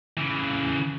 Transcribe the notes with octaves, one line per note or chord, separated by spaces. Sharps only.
C#3 E3